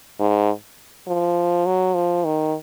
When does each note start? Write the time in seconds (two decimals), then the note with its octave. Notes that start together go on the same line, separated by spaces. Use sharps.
0.20 G#2
1.08 F3
1.66 F#3
1.95 F3
2.25 D#3